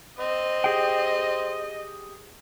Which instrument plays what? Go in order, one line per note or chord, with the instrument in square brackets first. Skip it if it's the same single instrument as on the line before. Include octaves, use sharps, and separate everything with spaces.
[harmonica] C4 [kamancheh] D#5
[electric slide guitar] G4 G#4 G5